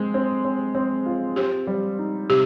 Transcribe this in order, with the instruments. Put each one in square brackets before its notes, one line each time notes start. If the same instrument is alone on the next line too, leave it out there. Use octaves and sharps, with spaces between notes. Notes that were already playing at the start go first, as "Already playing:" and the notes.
Already playing: [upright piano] G#3 C4
C4
C4
C4
F4
[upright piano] C4 [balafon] G4
[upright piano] G3
D#4
[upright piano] C3 [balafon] G4